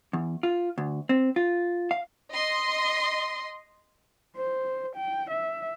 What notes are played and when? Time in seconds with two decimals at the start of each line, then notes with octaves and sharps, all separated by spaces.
0.13 E2
0.43 F4
0.78 D2
1.09 C4
1.36 F4
1.91 F5
2.33 D#5 C6
4.36 C5
4.96 G5
5.30 E5